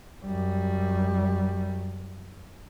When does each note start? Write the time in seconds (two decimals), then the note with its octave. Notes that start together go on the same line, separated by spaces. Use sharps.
0.25 F#2 G3